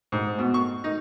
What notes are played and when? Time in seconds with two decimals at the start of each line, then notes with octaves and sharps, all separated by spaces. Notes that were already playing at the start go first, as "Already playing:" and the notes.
0.12 G#2
0.39 B2
0.54 C#6
0.84 D#4